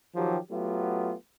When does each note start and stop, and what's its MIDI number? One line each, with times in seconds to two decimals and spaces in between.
0.15 0.37 51
0.15 0.37 53
0.15 0.37 54
0.15 0.37 67
0.51 1.14 54
0.51 1.14 57
0.51 1.14 59
0.51 1.14 65
0.51 1.14 67